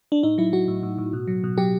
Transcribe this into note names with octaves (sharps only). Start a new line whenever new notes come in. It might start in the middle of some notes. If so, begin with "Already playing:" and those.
D4
A2 D#4
F#3 E4
F#3 F#4
A2
A2
A2
B2
F#3
B2
F#3 G4